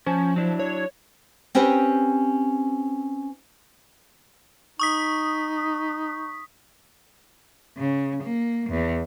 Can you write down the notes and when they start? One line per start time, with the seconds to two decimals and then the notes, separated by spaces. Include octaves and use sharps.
0.06 F3 C#4 G#5 A5
0.36 F#3 D4 E4
0.59 C#5
1.55 C4 C#4 G4 B4 C5
4.80 D#4 C#6 D#6 B6
7.78 C#3
8.23 A#3
8.70 E2